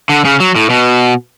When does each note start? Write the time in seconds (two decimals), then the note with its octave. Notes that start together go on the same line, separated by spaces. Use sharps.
0.09 D3
0.25 C#3
0.40 F#3
0.56 A2
0.70 B2